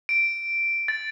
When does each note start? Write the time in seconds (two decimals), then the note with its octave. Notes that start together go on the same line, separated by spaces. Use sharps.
0.09 D7
0.88 A6